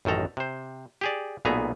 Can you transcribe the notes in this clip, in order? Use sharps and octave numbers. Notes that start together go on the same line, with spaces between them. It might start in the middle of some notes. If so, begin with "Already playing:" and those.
A1 F#2 D#3 A4 A#5
C3 C5
G4 G#4 D5
B1 A#2 A3 B3 G#4 A#5